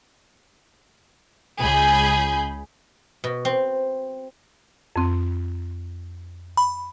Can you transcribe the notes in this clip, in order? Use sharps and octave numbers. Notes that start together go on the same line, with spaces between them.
C#2 G#4 B5 G6
B2
C4
F2 C4
B5